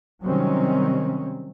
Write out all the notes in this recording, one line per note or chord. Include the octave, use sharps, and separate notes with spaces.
C3 D#3 F#3 G3 C4 C#4